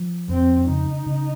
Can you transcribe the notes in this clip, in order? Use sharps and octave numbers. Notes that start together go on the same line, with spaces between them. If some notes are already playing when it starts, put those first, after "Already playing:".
Already playing: F3
F2 C4
C#3 D#4
C#3